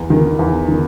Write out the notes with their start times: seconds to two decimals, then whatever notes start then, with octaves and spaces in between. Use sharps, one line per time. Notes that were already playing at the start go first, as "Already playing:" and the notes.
Already playing: E2
0.10 D#3
0.39 E2
0.68 D#3